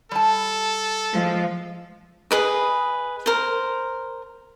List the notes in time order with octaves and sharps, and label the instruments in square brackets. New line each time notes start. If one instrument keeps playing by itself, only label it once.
[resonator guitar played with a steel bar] G3 A5 [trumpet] A4
[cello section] F3 G#3
[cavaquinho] G#4 B4 D#5
A#4 C5